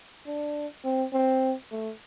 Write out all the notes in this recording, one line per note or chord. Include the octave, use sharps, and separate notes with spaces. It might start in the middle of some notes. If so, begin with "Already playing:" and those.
D4
C4
C4
A3